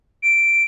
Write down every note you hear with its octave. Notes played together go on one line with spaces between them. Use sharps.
D7